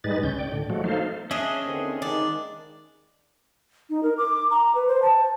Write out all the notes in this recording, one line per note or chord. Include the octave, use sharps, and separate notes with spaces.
G#2 G3 G#3 D#4 B4 A6
D2 C#3 C#4 G6
D5 G5
A2 D3
F3 F#3 G#3 A3 F#4
A#3 D#4 A4 C5 F5
C#4 D4 G#4 D#5 E5
D#2 D3 C4
D#2 D#3 G#3 D4
D#4
A#4
D6
A#5
B4
C5
A5